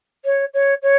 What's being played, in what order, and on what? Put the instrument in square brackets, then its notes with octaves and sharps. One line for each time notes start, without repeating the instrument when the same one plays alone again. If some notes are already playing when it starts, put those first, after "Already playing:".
[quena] C#5
C#5
C#5